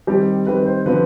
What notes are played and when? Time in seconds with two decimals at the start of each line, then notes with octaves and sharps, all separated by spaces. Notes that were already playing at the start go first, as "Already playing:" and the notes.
0.07 D#3 G3 C4 G4
0.47 D#3 G3 C4 B4
0.66 C5
0.86 D3 F3 C4 B4